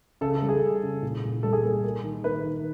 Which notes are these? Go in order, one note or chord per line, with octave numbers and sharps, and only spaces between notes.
C#3 A4
A4
G3
G#4
C#3
C#3
A#2
A#2
G3 A4
G#4
A#3 A4
A#3
D#3
A#3 B4
D#3